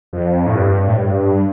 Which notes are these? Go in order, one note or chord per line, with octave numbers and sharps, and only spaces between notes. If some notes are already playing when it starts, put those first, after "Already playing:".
F2
A2
G2
A2
G2